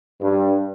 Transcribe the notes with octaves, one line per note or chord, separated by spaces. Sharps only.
G2